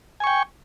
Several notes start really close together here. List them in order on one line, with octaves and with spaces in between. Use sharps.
G#5 C#6 G5